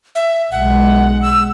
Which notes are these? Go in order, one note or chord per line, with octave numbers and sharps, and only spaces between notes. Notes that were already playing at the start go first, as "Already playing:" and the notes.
E5
B1 G#3 F#5
E6